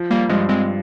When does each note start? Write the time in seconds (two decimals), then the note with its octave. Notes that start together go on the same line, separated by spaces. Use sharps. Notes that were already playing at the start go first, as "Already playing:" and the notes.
Already playing: F3
0.11 G3 A#3
0.29 G2 F3 G#3
0.49 G#3 C4